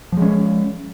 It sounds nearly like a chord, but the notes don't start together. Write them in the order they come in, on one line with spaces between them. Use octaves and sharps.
F3 G#3 C#4